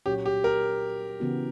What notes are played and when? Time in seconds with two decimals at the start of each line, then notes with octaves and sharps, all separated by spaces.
0.06 A#2 F#3 C#4 F#4 G4 C#5
0.26 G4
0.44 A#4
1.20 C#3 E3 B3 F#4